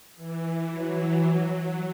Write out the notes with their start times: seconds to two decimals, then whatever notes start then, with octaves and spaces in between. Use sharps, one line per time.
0.16 E3
0.71 F#3
1.26 F#3